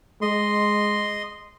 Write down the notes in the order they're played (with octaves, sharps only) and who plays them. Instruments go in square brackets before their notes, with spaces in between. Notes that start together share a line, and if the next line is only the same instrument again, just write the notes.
[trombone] G#3 [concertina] D#5 C6